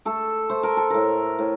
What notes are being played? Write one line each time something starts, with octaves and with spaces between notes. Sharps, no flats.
A3 A4
A3 C5
A#4
A4
A2 A#4
A2